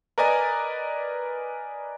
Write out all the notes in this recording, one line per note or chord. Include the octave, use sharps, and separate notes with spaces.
A#4 B4 D5 D#5 G#5 A#5